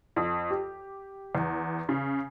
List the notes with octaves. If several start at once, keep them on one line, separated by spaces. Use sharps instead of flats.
F2
G4
E2
C#3